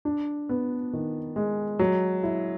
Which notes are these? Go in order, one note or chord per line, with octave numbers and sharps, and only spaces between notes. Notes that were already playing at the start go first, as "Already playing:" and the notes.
D4
B3
D#3
G#3
F#3
E4